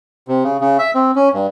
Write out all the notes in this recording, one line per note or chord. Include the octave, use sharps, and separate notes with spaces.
C3
C#3
C#3
E5
C4
C#4
G2